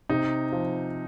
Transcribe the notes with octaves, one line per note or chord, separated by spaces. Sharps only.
C3 D#4
F3